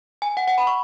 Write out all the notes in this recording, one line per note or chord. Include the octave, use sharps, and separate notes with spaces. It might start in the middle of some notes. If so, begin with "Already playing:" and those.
G#5
F#5
F#5
B5
C#6